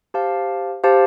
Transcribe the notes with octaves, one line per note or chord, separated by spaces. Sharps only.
G4 C5 F5 A5
G4 C5 F5 A5